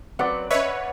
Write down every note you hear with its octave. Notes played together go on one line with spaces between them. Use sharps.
F#3 C4 B4 D5 F#5
C#4 B4 C#5 D#5 E5